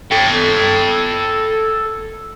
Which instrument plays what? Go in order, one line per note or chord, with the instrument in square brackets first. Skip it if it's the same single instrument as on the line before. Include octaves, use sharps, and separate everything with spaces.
[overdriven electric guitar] A4 G5